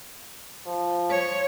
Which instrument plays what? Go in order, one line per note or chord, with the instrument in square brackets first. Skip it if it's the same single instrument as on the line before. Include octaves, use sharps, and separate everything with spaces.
[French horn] F3
[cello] C#5